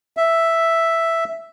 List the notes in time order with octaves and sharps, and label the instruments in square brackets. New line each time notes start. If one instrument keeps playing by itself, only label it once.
[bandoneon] E5